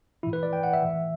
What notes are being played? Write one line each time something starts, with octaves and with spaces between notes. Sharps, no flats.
A2 E3 E4
B4
D5
G5
F#5
E5
A2 E3